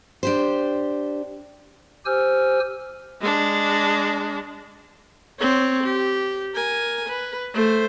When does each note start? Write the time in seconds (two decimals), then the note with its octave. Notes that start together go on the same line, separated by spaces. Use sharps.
0.23 D4 G4 C5
2.06 G4 C5 G#5 E6 F6
3.21 G#3 D4
5.40 C4 C#5
5.83 G4
6.54 A#4 G#5
7.08 B4
7.54 A3 C5